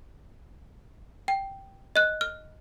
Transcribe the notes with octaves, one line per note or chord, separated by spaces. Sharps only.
G5
D#5 F#6
F6